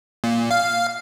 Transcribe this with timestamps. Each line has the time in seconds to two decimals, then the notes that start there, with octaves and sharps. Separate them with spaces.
0.24 A#2
0.51 F5